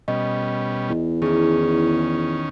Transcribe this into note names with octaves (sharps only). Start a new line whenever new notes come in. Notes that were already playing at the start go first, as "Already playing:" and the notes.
B2 G3 C#4 D#5
E2
D#3 C#4 E4 G#4